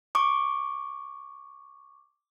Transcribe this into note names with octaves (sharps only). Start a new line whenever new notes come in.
C#6 D6